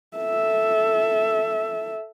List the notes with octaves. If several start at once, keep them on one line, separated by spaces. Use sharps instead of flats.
A4 E5